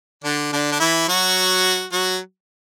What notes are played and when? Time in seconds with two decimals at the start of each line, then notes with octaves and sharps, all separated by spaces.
0.24 D3 D4
0.53 D3 D4
0.72 D4
0.80 E3 E4
1.08 F#3 F#4
1.92 F#3 F#4